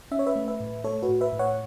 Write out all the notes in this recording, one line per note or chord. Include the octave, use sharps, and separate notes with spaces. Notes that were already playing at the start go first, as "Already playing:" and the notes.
C#4 E5
C#5
B4 E5
A3
B4 E5
A2
A3 A4 C#5
F#4 B4
A2
B4 E5
A2
C#5 F#5